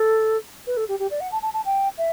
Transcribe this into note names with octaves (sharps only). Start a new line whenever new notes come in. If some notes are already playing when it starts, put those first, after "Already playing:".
Already playing: A4
B4
A4
G4
G4
D5
F#5
A5
A5
A5
G5
E5